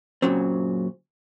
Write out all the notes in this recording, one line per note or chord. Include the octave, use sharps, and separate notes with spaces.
F#2 A#2 C#3 F#3 C4